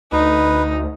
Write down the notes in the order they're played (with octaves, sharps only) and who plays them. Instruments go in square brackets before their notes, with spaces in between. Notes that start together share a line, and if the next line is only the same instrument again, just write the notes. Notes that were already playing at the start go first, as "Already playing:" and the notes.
[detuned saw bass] D2 [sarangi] D#4 [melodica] B4